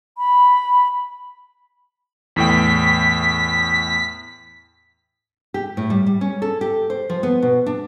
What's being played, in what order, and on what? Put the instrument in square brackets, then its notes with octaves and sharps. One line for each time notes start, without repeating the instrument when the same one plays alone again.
[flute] B5
[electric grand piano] E2 A2 G5 [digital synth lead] B6
[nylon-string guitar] G4
A2
G3
G3
C#4
A4
G4
C5
F3
B3
B2
D4